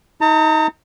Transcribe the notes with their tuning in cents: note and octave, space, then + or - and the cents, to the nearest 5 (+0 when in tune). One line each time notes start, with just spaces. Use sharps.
D#4 +25 A#5 -45